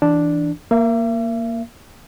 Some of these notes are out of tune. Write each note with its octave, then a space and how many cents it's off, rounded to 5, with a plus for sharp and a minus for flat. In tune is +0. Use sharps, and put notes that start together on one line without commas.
E3 +0 D4 +0
A#3 +0 E5 +40